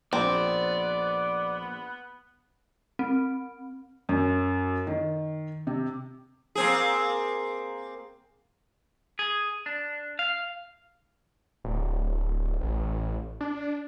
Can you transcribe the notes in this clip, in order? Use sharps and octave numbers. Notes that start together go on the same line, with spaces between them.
A#1 B3 C4 D5
C4
F#2
D#3
C3
A#3 C4 G#4
G#4
D4
F5
D1
A1
D4